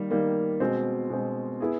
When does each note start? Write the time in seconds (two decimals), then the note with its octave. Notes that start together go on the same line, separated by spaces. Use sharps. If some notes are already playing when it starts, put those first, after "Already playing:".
Already playing: D#3 G3 A#3
0.11 D#3 G3 A#3
0.60 B2 G#3 C4
1.10 B2 G#3 C4
1.60 B3 E4 G#4